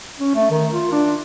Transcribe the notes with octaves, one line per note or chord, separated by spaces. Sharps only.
C#4
A3
D#3
F4
D4